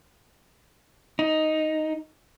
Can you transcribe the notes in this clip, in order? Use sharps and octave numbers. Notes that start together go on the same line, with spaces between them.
D#4